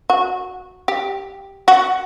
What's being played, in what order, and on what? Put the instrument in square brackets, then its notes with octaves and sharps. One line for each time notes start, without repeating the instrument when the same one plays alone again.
[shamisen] F#4
G4
F#4